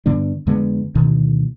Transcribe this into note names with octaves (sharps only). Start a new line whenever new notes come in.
G2 D3 B3 D4
F2 D3 G#3 B3
D2 B2 D#3